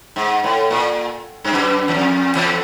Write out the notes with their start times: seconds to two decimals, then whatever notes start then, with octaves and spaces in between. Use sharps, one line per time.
0.16 G#2
0.44 A2
0.71 A#2
1.44 G2
1.53 F#2
1.88 E2
1.94 F2
2.35 E2